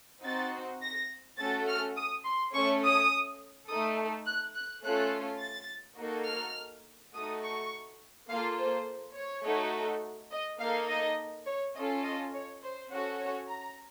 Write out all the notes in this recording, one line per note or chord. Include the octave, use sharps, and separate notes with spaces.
C4 D#4 F#4 A6
A#6
A3 C#4 F#4 A4 A6
F6
D#6
C6
A3 C#4 A4 C#6
D#6
A3 D#4 A4 D#6
F#6
F#6
A3 C#4 F4 A4 F#6
A6
A#3 D#4 F#4 A4
F6
A3 D#4 F#4 A4 D#6
C#6
A#3 F4 A4 F5
C5
C#5
A3 D#4 F#4 A4
D#5
A#3 D#4 A4 F5
D#5
C#5
C#4 F4 A4 D#5
D#5
C#5
C5
C#4 F#4 A4
C#5
A#5